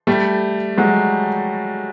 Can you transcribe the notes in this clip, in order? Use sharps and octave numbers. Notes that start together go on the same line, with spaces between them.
G3 A3
F#3 G#3